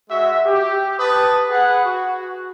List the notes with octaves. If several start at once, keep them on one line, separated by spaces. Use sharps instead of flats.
G#3 F#4 E5
G4
B4 A5 D#6
G#4 B4 F#5
F#4